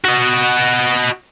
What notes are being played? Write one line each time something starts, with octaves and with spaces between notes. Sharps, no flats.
F#4 D#5